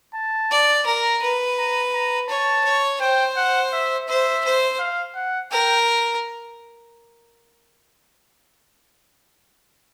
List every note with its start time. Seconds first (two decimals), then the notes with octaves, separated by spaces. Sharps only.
0.14 A5
0.51 D5
0.87 A#4 A#5
1.22 B4
1.57 A#5
1.94 A#5
2.29 C#5 A5
2.65 C#5
3.00 C5 G5
3.37 F#5
3.73 E5
4.08 C5 E5
4.44 C5
4.79 F5
5.15 F#5
5.51 A#4 G5